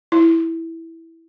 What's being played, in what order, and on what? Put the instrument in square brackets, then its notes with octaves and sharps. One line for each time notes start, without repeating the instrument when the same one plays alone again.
[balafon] E4